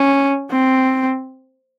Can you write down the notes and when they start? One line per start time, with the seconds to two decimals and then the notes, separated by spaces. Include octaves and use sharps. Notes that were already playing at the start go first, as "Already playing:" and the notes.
Already playing: C#4
0.50 C4